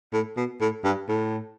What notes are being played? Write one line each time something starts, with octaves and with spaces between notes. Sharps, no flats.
A2
B2
A2
G2
A2